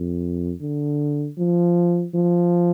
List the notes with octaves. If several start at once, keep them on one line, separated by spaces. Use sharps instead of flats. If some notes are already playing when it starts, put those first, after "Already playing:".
Already playing: F2
D3
F3
F3